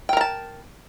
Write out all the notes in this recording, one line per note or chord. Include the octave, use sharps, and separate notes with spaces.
A#4 G5 A5 A#5